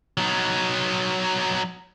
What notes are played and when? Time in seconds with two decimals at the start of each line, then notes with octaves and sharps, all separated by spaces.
0.18 F#3 D#4